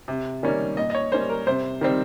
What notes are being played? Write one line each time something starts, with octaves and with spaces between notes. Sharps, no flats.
C3
D#3 G3 A#3 C#4
A#2 D#5
D#5
C#5
G3 A#3 C#4 C5
A#4
C3 C5
D#3 G3 C4